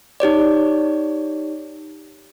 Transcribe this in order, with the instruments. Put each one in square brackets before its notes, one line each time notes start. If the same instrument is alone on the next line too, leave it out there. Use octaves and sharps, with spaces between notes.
[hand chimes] D#4 G4 C#5 D5